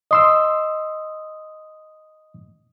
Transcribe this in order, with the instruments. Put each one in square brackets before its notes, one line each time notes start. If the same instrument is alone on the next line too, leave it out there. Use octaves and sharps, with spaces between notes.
[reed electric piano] D#5 C6 E6 [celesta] D#6